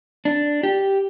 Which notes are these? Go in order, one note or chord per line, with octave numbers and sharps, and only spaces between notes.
D4
G4